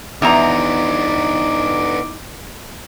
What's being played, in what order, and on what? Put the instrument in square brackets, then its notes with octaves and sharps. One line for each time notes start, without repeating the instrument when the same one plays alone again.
[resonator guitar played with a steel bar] E2 A#5 [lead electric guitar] B3 D4 [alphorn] D#4 [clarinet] D6